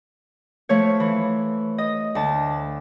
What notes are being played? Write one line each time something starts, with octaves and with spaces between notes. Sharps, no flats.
F3 A3 C#5
E3
D#5
D2 A5